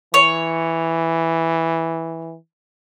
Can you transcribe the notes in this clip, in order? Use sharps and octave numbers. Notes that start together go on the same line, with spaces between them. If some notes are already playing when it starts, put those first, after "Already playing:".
E3 C#5